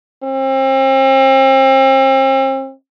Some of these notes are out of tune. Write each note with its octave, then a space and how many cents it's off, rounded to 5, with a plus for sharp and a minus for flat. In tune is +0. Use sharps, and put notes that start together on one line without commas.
C4 +40